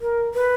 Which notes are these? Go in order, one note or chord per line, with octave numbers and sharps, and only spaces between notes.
A#4
B4